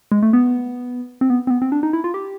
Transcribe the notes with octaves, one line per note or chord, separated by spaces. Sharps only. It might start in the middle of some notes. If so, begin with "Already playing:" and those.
G#3
A3
B3
C4
B3
C4
B3
C4
D4
D#4
E4
F4
G4